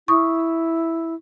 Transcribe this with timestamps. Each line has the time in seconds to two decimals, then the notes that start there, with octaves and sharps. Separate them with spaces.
0.08 E4 C#6 D#6